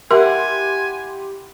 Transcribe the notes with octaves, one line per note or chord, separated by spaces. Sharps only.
E4 G4 A#4 F#5 G#5 C6